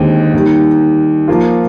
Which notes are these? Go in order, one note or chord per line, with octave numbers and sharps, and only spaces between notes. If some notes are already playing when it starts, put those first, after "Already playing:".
Already playing: D#2 D3 G#3 C4 G4
D#2 D#3 G3
F3 A#3 F4